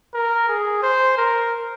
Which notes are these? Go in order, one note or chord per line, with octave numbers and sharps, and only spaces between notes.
A#4
G#4
C5
A#4